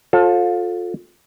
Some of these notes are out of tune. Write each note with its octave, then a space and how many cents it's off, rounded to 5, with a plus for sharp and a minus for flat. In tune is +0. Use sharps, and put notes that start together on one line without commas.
F4 +30 A4 +0 C5 +40